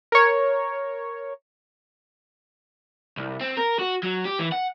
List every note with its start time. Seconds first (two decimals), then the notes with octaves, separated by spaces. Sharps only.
0.12 A#4 C#5
3.17 C2
3.41 C4
3.57 A#4
3.79 F#4
4.03 F#3
4.25 G4
4.39 E3
4.52 F#5